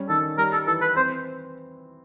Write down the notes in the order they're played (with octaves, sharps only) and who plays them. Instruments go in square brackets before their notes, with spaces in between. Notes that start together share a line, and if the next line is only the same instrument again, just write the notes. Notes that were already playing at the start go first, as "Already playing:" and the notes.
Already playing: [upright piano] G3 C#4
[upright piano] D#3 [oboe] A4
[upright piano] G3 [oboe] A#4
[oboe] A4
[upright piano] E3 [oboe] A4
[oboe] B4
[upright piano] C4 [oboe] C5